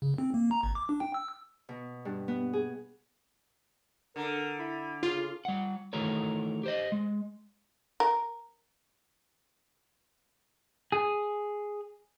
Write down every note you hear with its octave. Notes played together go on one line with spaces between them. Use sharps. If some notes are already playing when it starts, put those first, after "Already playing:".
C#3
C4
A#3
A#5
G#1
D6
D4
G5
E6
B2
G2
B3
G#4
D3 A#4
E4 B5
C#3 F4
G3 F#5
D#3 E3 A3 F#4 A#4 C#5
G4 C5 D#5
G#3
A#4
G#4